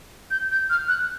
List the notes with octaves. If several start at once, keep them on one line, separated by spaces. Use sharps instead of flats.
G6
G6
F6
F#6